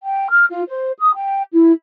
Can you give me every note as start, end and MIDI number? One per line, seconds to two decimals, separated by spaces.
0.04 0.27 79
0.30 0.45 89
0.50 0.63 65
0.68 0.91 72
0.98 1.11 87
1.14 1.43 79
1.53 1.71 64